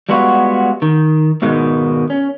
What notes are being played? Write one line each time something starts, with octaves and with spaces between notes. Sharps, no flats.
G3 G#3 B3 F4 F#4
D#3
G#2 B2 D#3 G#3
C#4